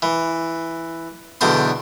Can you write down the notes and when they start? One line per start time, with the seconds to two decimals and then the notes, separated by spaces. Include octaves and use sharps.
0.02 E3
1.41 B1 E2 D3 C5 C6